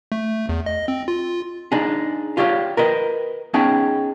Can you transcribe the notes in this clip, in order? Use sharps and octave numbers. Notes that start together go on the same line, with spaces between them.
A3
E2
D#5
C4
F4
D4 D#4 G#4
F4 G4 C#5 D5 E5 F5
A#4 B4 D#5
B3 C#4 D#4 G#4 G5 A5